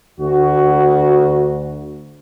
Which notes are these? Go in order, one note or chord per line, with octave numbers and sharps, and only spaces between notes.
D2 F#4